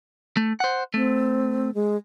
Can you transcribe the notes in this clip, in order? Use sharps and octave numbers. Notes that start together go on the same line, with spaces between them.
A3
C5 F#5
A3 C4
G#3